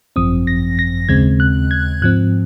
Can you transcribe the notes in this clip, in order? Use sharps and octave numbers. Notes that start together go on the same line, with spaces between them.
G#1 F#2 F3 C4 D#6
A#6
A#6
D#2 C#3 G#3 C4 G#6
F#6
G#6
G#2 F3 C4 F#6